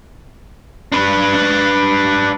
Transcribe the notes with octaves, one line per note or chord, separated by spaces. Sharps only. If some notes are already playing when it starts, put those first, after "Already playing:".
D4 B4